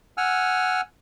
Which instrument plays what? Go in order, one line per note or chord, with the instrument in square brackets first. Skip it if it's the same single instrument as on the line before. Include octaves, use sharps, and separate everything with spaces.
[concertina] F#5 G#5 E6 F6